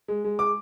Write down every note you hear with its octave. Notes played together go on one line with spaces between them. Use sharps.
G#3
G#3
D6